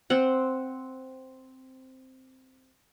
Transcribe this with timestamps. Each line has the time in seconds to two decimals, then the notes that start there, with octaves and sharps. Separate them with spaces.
0.10 C4 F#5